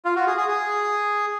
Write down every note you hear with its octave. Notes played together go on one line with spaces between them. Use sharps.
F4
F#4
G#4
G#4
G#4